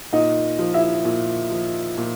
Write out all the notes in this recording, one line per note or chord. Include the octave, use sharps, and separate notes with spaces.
A#2 D#4 D#5
F3
E4 E5
A#2
F3
A#2